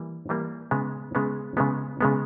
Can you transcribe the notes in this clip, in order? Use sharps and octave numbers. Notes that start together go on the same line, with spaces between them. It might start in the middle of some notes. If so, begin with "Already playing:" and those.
Already playing: E3 G3 A#3
E3 G3 A#3
C#3 G#3 B3
C#3 G#3 B3
C#3 G#3 B3
C#3 G#3 B3